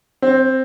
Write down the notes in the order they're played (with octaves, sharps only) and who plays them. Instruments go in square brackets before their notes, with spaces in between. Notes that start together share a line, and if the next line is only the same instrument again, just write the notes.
[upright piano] C4